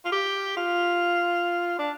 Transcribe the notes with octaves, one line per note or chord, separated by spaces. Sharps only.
F4
G4
F4
D4